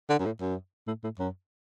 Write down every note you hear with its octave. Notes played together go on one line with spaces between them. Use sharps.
D3
F#2
A2
F#2
A2
A2
F#2